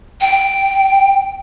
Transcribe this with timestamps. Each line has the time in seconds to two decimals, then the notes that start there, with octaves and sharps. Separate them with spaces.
0.21 G5